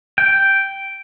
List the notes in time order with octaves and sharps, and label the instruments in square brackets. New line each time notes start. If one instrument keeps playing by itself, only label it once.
[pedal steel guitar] G5